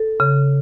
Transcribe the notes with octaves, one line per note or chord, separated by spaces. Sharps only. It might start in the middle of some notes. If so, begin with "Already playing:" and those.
Already playing: A4
C#3